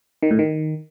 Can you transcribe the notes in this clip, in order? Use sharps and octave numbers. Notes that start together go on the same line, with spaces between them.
D#3
A2
D#3